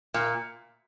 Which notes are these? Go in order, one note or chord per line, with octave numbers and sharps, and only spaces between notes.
A#2